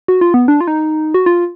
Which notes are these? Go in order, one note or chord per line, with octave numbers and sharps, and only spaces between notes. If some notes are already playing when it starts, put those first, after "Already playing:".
F#4
F4
B3
D4
F4
D#4
F#4
F4